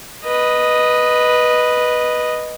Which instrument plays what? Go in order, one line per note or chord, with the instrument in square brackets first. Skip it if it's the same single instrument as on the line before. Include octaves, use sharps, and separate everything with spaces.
[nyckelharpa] B4 D#5